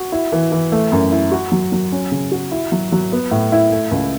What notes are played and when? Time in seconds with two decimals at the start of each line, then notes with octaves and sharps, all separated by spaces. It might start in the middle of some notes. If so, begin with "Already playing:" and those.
Already playing: F#4
0.12 E4
0.32 E3
0.52 E3
0.72 A3
0.92 F#2
1.12 E4
1.32 F#4
1.52 F#3
1.72 F#3
1.92 C#4
2.12 C#3
2.32 F#4
2.51 E4
2.72 F#3
2.92 F#3
3.12 B3
3.31 A2
3.52 E4
3.72 A3
3.91 C#2